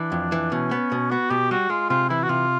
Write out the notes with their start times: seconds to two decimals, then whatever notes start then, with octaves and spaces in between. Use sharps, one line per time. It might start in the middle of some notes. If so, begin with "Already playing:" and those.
Already playing: E3 D4
0.12 F2
0.32 E3
0.52 B2 C#4
0.71 B3
0.92 B2
1.11 B3 F#4
1.30 B2 G4
1.51 G3 F#4
1.70 G#3 F4
1.89 C3 F4
2.09 E3 E4
2.23 F#4
2.29 C3 F4